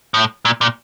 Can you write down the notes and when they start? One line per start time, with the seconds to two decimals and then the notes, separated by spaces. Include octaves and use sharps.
0.14 A2
0.45 A#2
0.61 A#2